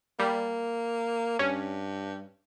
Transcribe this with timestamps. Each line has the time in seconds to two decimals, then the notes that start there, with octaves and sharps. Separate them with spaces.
0.19 G3 A#3
1.39 G2 C#4